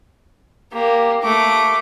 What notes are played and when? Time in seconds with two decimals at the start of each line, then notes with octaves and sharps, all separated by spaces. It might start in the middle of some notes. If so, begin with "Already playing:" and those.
0.73 A#3 G4
1.22 A3 D6